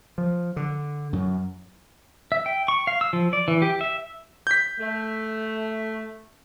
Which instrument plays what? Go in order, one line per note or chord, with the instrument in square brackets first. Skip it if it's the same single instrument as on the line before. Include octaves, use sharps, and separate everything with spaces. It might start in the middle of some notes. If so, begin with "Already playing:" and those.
[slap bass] F3
D3
F#2
[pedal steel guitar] E5
G5
C#6
F5
E6
F3
D5
E3
G4
E5
[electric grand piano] G6 B6
[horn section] A3